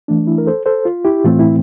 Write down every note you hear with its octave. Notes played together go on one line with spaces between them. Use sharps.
E3 A3 D4
E4
A#4
A4 C5
A4 C5
F4
E4 G4
A2 E3 A3 C4 F4
E4